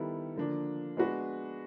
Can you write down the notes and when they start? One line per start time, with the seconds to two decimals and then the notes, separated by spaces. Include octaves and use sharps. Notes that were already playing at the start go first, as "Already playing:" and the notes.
Already playing: D#3 G3 B3 E4 A4
0.36 D3 F3 A#3 D4
0.97 G#3 B3 D4 F#4 B4